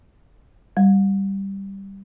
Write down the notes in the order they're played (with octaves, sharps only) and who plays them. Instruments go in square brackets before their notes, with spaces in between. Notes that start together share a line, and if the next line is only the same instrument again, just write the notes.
[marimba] G3